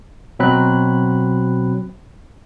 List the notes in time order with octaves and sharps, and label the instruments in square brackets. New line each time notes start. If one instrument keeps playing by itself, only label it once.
[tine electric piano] B2 F#3 C4 B5 F#6